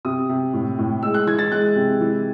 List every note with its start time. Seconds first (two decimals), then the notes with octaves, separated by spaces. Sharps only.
0.05 C3 D#6
0.29 C3
0.53 A2
0.78 A2
1.03 G#3 E6
1.14 F#6
1.27 E3 G#6
1.39 A6
1.52 G#3 F#6
1.76 C3
2.01 E3